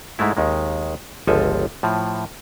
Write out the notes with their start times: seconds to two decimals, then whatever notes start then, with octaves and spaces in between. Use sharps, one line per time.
0.19 G#2 G#3 A3 E4
0.37 D#2 D#3 G#3
1.27 G1 C#2 F3 A4 G#5
1.83 A2 F3